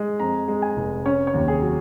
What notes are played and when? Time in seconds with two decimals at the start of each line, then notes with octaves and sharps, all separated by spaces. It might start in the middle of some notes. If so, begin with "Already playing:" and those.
Already playing: G#3
0.20 F2 A#5
0.48 G#3
0.62 G#5
0.77 F1
1.05 C#4 C#5
1.27 C#5
1.34 D#2
1.48 G#4
1.62 F#3